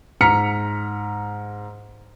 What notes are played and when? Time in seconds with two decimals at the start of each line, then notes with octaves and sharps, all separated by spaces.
0.21 G#2 A#5 F6 B6 C#7